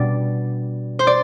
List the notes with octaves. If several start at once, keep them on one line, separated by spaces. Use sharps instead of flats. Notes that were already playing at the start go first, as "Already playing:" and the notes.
Already playing: B2 G3 D4 D5
C5
D5